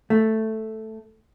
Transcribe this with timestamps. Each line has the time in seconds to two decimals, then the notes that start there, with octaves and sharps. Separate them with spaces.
0.10 A3